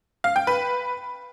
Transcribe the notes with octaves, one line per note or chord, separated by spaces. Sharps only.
F5
G5
B4